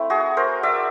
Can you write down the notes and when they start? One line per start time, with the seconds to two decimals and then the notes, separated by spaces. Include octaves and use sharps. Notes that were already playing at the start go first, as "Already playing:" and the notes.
Already playing: A3 C4 E4
0.10 F#4 G#4
0.37 A#4 C5
0.63 D5 E5